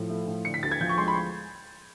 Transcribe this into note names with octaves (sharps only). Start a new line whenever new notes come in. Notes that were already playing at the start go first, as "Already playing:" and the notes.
Already playing: A2 F3
A3
A2
D3 C#7
B6
D2 A6
G#6
F3 G6
C#6
G#3 C6
B5